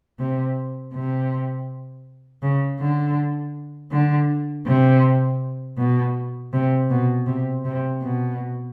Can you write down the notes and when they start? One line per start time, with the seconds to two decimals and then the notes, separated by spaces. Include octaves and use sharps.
0.19 C3
0.94 C3
2.42 C#3
2.80 D3
3.91 D3
4.66 C3
5.77 B2
6.53 C3
6.90 B2
7.27 C3
7.65 C3
8.02 B2